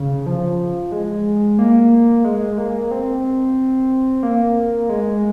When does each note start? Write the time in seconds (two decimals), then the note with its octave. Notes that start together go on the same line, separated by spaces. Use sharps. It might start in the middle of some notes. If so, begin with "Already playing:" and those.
Already playing: C#3
0.26 F3
0.92 G#3
1.59 A#3
2.24 G#3
2.58 A#3
2.91 C4
4.23 A#3
4.89 G#3